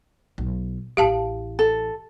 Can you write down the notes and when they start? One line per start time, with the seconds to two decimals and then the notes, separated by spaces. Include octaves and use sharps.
0.38 B1
0.97 A1 E4 G4 F5 A5
1.59 A4